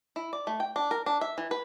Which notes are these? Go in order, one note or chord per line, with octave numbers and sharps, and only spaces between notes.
E4
D5
A3
G5
D4
A#4
D4
E5
E3
B4